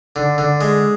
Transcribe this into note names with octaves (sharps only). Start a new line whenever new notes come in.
D3
D3
G#3